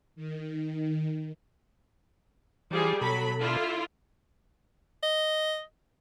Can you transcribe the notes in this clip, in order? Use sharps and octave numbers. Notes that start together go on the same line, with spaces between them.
D#3
E3 F3 G3 G#4
B2 F#3 A4 B5
D3 E4 F4
D#5